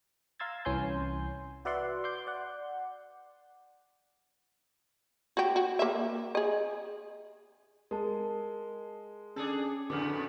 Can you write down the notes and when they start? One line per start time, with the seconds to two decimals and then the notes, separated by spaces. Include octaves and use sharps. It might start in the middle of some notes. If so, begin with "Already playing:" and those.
0.40 F5 A#5 C6 E6 G#6 A6
0.65 C2 E3 C#4 G#5 C6 G6
1.65 F#4 B4 D5 E5 F#5 C6
2.04 C6 D6 G6
2.27 D5 F#5
5.37 F#4 G4
5.56 F#4
5.79 A#3 E5
6.35 G#4 D#5
7.91 G#3 A#4 A5
9.36 C#4 D4 G#4 A4
9.90 F2 A2 D3 B3 D6 F6